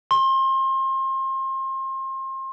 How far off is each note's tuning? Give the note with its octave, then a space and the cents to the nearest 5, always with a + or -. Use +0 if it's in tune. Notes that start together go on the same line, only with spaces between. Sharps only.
C6 +30